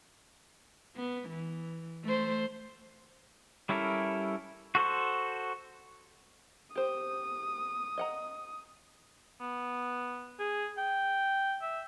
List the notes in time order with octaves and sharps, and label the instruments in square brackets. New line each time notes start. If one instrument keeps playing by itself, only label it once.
[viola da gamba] B3
E3
A3 C5
[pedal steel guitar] G3 C#4 E4 A4 A#4
F#4 A4 C5 C#6
[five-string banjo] G4 C5 [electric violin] D#6
[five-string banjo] D#5 F#5 A#5
[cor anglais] B3
G#4
G5
E5